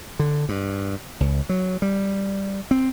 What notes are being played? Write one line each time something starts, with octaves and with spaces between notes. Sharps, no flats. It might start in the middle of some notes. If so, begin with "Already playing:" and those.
D3
G2
C#2
F#3
G3
C4